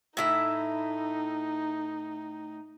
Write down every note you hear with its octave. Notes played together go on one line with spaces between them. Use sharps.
A2 D#4 E4 E5